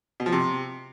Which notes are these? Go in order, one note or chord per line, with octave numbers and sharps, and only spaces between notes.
B2
F3
C3